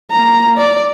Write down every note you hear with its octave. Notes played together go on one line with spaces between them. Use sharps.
A#3 A#5
D5